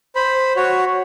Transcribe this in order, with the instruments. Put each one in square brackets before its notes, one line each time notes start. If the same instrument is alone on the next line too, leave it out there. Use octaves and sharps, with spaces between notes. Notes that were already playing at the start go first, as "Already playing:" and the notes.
[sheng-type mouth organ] C5 B5
F#4 C#5